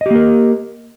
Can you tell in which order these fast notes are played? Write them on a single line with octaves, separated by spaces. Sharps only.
D#5 G4 A#3 A#4